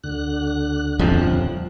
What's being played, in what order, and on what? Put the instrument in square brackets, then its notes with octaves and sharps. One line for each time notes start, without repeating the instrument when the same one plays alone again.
[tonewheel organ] D2 D3 F#6
[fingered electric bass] D#1 F2 F3